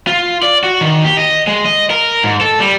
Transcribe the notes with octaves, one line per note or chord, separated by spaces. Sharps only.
F4
D5
F#4
D#3
G4
D#5
G#3
D#5
A#4
G#2
A4
G3